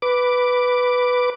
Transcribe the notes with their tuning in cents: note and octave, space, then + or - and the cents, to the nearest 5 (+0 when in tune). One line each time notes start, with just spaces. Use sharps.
B4 +0 D6 +0